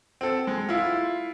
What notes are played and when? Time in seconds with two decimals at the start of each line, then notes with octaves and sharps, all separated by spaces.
0.21 C4 A4
0.47 G#3
0.69 E4 F4